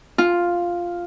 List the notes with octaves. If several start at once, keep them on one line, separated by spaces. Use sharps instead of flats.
F4